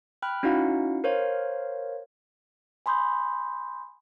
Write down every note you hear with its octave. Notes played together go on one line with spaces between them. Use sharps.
G5 B5 F6 F#6
C#4 D#4 E4 F#4 F5 F#5
A#4 C5 C#5 F5
G#5 B5 C6 D#6 G6